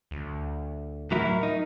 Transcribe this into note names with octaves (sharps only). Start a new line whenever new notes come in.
D2
A2 F#3 E4 A#4
D#4